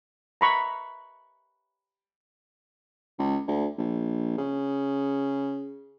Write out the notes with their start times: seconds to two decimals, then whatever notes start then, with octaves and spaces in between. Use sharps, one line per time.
0.41 A#5 B5 C#6
3.19 C#2
3.48 D2
3.78 A#1
4.37 C#3